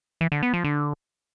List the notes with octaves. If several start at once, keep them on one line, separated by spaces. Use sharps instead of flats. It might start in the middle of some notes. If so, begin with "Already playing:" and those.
E3
D3
B3
F3
D3